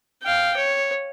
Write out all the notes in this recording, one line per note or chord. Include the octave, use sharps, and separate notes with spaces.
F5 G5
C#5